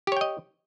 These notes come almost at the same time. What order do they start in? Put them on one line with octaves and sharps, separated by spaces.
G4 C#5 G5 D#5